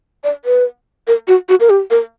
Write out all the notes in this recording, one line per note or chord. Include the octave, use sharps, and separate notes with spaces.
D5
B4
A#4
F#4
F#4
A#4
G4
A#4